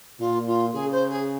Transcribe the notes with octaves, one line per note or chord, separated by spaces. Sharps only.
A#2 F4
F4
C#3 G#4
C5
G#4